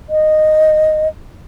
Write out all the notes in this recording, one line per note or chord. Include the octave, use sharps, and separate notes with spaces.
D#5